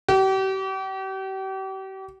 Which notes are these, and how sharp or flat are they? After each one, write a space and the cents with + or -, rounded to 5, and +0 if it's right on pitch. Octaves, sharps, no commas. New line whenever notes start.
G4 -40